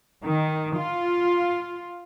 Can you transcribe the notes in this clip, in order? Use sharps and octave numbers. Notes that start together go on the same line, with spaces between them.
D#3
F4